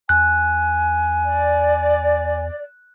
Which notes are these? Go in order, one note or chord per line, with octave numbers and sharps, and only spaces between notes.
E2 G#5 F#6
D5